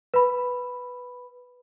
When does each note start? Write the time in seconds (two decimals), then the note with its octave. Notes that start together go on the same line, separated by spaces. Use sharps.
0.14 B4 B5